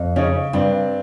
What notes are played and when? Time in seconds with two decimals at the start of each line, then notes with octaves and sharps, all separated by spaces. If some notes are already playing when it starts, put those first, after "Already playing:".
Already playing: F2
0.16 C#3 C#4 D#4
0.53 G2 C4 D4